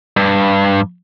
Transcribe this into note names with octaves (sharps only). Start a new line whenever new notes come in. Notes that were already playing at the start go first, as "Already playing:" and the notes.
G2